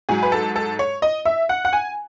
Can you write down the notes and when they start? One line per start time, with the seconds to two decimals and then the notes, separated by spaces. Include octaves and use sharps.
0.09 G#2 F#3 G#4
0.23 B4
0.32 A4
0.56 A4
0.79 C#5
1.02 D#5
1.25 E5
1.49 F#5
1.65 F#5
1.73 G#5